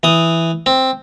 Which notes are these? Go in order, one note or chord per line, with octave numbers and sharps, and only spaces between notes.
E3 D#6
C4